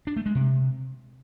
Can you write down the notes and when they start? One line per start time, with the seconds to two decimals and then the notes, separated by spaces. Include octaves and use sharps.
0.07 D4
0.16 A3
0.26 G#3
0.35 C3